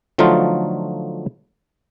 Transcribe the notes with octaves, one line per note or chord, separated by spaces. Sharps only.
D3 F3 F#3 A3 D#4 F4